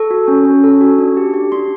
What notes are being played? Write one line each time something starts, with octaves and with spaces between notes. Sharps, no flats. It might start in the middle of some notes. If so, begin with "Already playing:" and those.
Already playing: A4 C#6
F#4
C#4
C#4
A4
F#4
D4
G4
G4
D4 C6